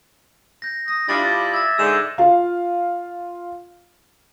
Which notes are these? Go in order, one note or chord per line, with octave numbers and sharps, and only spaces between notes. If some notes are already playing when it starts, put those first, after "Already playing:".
G6 A#6
D#6 A#6
G3 D4 E4 F4 D6 D#6 A6
A5
E5 G#6 A6
G#2 D3 G#3 E6 E7 G7
F4 F5